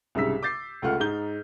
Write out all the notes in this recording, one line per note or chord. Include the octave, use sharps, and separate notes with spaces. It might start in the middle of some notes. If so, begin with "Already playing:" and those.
C2 G#2 C#3 E6 B6
D6 G6 A6 C7
C#2 A3 F4 F#5 F6
G#2 D#4 G6 G7